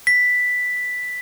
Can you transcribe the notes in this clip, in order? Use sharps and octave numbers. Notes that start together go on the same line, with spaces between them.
B6